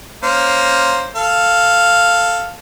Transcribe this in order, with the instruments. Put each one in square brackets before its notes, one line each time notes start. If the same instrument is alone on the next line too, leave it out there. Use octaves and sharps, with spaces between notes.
[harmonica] A#3 C#4 C5
A4 F5